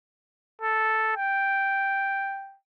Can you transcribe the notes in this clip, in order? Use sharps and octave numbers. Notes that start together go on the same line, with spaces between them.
A4
G5